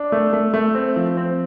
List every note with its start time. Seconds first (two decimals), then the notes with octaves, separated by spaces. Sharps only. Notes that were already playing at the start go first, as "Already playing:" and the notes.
Already playing: D4
0.12 A3
0.33 A3
0.54 A3
0.75 C4
0.96 F3
1.17 C4